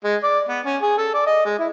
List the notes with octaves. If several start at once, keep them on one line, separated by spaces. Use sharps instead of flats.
G#3
D5
B3
C#4
G#4
A4
D5
D#5
G#3
E4